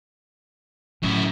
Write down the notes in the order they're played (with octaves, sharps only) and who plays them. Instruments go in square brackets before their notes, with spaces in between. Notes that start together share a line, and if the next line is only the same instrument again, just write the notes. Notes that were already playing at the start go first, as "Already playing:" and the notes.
[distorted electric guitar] F#2 E4 [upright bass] A2